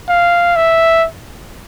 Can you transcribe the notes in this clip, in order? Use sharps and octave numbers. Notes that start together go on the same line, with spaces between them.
F5
E5